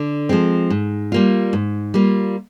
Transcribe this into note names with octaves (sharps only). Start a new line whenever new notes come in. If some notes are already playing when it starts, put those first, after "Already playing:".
Already playing: D3
F3 G#3 C4
G#2
G3 A#3 F4
G#2
G3 A#3 F4